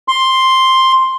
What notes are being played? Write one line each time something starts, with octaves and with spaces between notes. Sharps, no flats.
C6